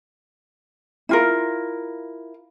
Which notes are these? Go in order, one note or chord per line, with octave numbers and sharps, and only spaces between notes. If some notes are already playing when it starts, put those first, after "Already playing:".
E4 F4 A#4